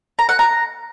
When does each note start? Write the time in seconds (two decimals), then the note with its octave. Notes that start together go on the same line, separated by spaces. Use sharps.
0.19 A#5
0.29 F#5
0.39 A#5